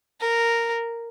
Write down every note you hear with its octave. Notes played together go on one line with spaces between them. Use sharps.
A#4